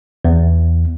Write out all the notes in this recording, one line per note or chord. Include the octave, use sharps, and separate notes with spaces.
E2